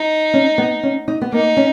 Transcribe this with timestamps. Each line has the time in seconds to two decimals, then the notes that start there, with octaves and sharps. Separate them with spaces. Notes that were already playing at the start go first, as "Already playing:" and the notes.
Already playing: D#4
0.34 C#4
0.58 B3
0.83 C#4
1.08 D#4
1.21 B3
1.32 A#3 D#4
1.57 C#4